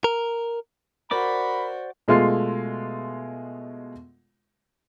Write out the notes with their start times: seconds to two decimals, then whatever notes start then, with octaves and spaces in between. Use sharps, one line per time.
0.04 A#4
1.11 F#4 A#4 C5 D5 B5 D6
2.08 B2 G#3 A3 F4 C6 C7